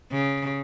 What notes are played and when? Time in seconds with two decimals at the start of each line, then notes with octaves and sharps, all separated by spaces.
0.12 C#3